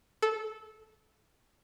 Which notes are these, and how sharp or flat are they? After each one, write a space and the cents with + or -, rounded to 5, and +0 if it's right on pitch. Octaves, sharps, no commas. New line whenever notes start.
A4 -15